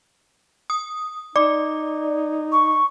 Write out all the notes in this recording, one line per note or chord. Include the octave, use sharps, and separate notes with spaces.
D#6
D#4 D5 D6
C#6